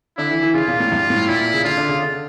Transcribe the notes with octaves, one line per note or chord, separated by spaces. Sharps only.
D3 E4
E3
E3
C#3 F4
A#2
A2
G2
A2
A#2 E4
C#3
D3 F4
D3
C#3
D3